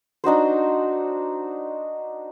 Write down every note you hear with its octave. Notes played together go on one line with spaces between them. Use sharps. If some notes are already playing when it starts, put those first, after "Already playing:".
D4 D#4 F#4 C5